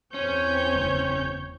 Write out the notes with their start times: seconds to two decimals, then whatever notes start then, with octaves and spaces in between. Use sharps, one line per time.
0.14 E2 C4 C#4 C#5 G6
0.76 F#1